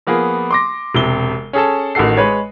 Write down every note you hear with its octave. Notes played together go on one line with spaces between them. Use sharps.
F3 A#3 B3 G#4
C6 D6 A#6
E1 C3 G7
C#4 G#4 A4 A5
A1 D#3 F#4 A4 C7
G#3 B4 C#5